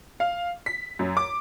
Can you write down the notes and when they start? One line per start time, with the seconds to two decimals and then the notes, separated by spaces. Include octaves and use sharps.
0.20 F5
0.66 B6
0.99 F#2
1.17 D6